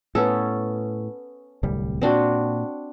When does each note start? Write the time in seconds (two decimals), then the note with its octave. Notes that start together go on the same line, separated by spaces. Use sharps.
0.15 A2 B3 C#4 A4
1.63 D1 C2 G3
2.02 A#2 C4 D4 F#4